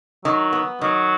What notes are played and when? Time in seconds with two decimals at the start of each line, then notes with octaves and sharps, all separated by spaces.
0.25 D#3 F#3
0.53 B3
0.81 D#3 F#3